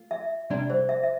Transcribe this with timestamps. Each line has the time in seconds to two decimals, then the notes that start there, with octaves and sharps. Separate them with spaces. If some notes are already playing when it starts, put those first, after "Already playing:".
Already playing: A3 F4
0.11 E5
0.50 C3 G3 D4 D5
0.70 C5
0.89 E5
1.04 E5